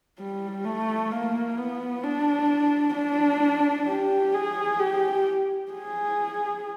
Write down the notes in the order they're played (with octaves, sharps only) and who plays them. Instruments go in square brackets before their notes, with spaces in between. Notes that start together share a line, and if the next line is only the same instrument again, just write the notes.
[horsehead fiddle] G3
A3
A#3
B3
D4
D4
G4
G#4
G4
G#4